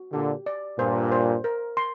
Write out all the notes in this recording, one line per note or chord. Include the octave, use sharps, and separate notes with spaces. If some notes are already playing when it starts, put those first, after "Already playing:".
Already playing: F#4
A#2 D3 G4
D5
G2 A#2 C5
C5
A#4
C6